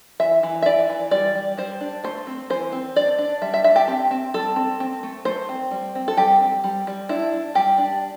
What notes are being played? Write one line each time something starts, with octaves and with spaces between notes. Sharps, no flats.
E3 E5
E3
E5
E3 D5
E3
G3 D5
G3
G3 C5
D4
A3 C5
C4
E3 C5
C4
D4 D5
D4
G3 E5
E5
D4 E5
G4
C4 G4
C4
G3 A4
C4
C4
A3
A3 C5
C4
G3
C4
A4
G3 G4
C4
G3
G3
D4 E4
D4
G3 G4
D4